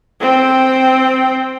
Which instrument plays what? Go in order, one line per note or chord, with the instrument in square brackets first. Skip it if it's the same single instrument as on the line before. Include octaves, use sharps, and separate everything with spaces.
[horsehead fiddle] C4 G5